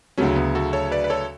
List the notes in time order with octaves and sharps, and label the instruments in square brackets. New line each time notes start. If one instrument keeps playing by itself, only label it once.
[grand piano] D2 C#3 F#3 [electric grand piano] A3 C#4
[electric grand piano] B3
F#4 A4
A4 C#5
B4 D5
B4
A4 C#5